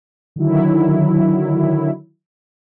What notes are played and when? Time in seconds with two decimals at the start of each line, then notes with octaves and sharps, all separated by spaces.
0.36 D3 D#3 F#3 E4